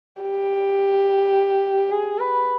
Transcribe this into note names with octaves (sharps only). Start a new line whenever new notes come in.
G4
G#4
B4